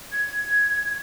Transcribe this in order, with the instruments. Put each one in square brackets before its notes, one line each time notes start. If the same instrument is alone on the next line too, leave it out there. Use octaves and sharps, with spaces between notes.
[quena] G#6